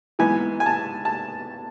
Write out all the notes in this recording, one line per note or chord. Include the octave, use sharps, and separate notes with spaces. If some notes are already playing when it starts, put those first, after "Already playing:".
G#2 E3 B3 G#5
G#5
A5
A5